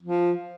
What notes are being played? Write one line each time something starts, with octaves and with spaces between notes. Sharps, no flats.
F3